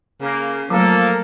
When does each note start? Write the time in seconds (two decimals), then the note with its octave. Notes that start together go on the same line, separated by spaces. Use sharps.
0.21 C#3 A#3
0.70 F3 F#3 A3 A#3 A4